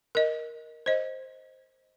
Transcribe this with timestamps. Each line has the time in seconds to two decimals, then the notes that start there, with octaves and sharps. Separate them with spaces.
0.15 A#4 D#5
0.86 C5 D#5